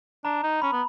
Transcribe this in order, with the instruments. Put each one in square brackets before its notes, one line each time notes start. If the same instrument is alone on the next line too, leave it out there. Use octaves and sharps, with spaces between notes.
[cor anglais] D4 [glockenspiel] A#5
[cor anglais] D#4
[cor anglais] C#4 [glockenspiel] B5
[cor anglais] B3